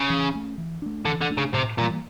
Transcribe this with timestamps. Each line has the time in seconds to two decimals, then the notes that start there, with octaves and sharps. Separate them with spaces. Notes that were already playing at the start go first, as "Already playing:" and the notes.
Already playing: C#3
0.10 E3
0.34 A3 C#4
0.58 E3
0.82 A3 D4
1.05 D3 E3
1.21 D3
1.30 A3 D4
1.38 C#3
1.54 A2 C3
1.78 A#2 E3 G3 A#3